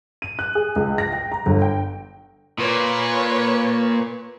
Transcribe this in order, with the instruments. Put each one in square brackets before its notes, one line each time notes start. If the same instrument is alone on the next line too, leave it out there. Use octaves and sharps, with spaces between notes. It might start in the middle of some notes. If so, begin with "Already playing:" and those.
[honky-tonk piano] D#7
F#6
G#4
C#2
A#6
G5
A#5
G1
G5
[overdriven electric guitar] A#2 [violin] B4 C#5